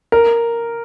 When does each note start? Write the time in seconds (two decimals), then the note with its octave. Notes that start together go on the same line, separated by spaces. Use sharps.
0.12 A#4